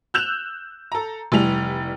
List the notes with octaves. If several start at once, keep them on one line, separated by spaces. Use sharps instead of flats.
E6 F#6 G6 E7 F7
A4 A#5
F1 E3 G3 F7